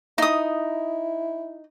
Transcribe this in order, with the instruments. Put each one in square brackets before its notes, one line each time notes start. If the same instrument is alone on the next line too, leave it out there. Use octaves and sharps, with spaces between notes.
[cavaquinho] D#4 D#6 [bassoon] E4